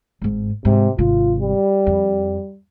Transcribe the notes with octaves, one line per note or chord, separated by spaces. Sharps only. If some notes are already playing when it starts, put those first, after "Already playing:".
G#1 G#2
G#2 C3
G#1 C3 F4
G3
F2